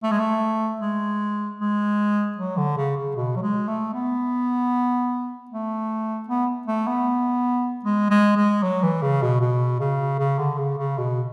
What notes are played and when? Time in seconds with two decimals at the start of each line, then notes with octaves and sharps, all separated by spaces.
0.03 A3
0.11 G#3
0.19 A3
0.82 G#3
1.60 G#3
2.38 F#3
2.57 D3
2.77 C#3
2.97 C#3
3.16 B2
3.36 F#3
3.42 G#3
3.68 A3
3.94 B3
5.51 A3
6.28 B3
6.67 A3
6.87 B3
7.85 G#3
8.11 G#3
8.37 G#3
8.63 F#3
8.83 E3
9.02 C#3
9.22 B2
9.41 B2
9.80 C#3
10.19 C#3
10.39 D3
10.58 C#3
10.78 C#3
10.98 B2